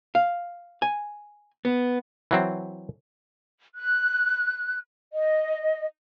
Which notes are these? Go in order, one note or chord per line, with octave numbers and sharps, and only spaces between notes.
F5
G#5
B3
E3 F#3 C4
F#6
D#5